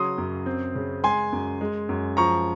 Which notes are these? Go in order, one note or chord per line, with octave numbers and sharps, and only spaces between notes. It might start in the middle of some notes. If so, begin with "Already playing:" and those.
Already playing: C#3 F#3 C6 D#6
F#2
C4
C#3
G#3 G#5 C6
F#2
G#3
F#2
F3 A#5 C#6